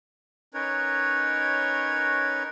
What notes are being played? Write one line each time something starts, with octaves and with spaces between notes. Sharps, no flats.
C#4 D#4 A#4 B4 C#5